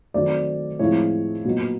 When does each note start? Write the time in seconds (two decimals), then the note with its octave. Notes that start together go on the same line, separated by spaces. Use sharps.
0.14 D#3 F#3 A3 C4 D5
0.79 A2 F3 G#3 C4 E4 C#5
1.45 A#2 F#3 B3 D#4